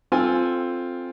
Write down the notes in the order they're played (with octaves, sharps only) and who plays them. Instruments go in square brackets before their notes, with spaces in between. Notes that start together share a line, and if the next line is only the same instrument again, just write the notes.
[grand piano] C4 F4 A4 G#5